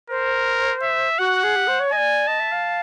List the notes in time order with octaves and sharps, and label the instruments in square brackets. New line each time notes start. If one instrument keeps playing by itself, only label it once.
[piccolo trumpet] A#4 [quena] C5
[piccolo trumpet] E5
[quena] F#4 [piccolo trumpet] F#5
[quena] G#4
G4
C5
C#5
[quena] D#5 [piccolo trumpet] G#5
[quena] D5
[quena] D#5 [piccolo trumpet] A5
[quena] E5
F5